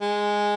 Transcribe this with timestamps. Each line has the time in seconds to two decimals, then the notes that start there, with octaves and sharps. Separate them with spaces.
0.01 G#3